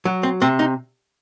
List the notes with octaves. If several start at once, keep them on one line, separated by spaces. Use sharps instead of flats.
F#3
C4
C3 C4
D#4